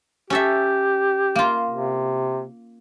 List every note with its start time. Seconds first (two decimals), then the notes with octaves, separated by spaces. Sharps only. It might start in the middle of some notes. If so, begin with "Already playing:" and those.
0.30 C#4 G4 A4 E5
1.36 A#3 F4
1.70 C3